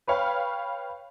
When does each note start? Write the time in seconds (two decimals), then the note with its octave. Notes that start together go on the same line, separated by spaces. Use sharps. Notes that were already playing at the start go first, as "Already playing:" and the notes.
0.07 B4 C#5 F5 G5 B5